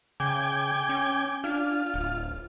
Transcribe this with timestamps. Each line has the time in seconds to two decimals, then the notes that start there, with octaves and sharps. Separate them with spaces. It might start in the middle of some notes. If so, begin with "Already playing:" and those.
0.20 C#3 G5 G#5 D6
0.89 C#4
1.44 D4 F4
1.94 D1